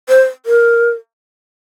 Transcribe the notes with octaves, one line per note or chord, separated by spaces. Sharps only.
C5
A#4